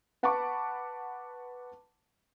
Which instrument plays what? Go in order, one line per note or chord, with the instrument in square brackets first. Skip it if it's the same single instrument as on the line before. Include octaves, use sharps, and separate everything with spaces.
[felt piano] B4 F#5 A5 B5 C#6 D6